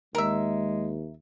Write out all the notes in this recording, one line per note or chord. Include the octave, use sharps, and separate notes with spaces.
D#2 G#3 A#4 E5